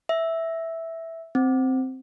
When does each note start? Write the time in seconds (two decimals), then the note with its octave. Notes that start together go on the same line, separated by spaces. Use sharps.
0.09 E5
1.35 C4